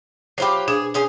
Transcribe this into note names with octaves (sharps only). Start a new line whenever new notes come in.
F#3 F4 G4 C5 B5
B2 D4 G#4
C#4 G#4 C5